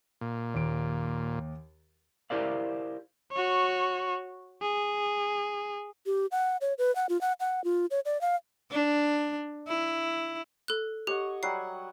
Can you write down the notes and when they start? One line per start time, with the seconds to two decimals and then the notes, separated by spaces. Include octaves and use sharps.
0.21 A#2
0.54 D#2 D7
2.30 E4 G4 A#4 C5 D5 F5
3.32 F#4 C#5
4.61 G#4
6.06 G4
6.32 F#5
6.61 C#5
6.78 B4
6.96 F#5
7.09 F4
7.21 F#5
7.40 F#5
7.64 F4
7.91 C#5
8.05 D5
8.21 F5
8.71 D4
9.68 E4
10.68 A4 F#6
11.07 G4 C#5 D#5 F#5
11.43 F#3 G3 F#5 C7